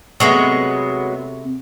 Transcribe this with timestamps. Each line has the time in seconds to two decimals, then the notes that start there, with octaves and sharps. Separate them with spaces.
0.20 C3 F#3 G#3 A3 B3